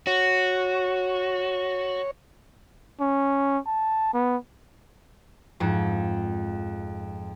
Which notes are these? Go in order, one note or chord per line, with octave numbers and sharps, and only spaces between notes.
F#4 C#5
C#4
A5
B3
F2 G#2